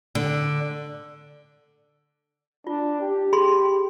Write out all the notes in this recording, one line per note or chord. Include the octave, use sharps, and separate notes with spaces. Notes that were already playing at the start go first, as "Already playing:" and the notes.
D3
D4 F4
G4
G#4 B5 C6